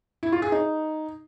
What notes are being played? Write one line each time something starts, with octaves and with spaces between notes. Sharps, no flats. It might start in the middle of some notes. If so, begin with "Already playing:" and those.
E4
F4
G#4
D#4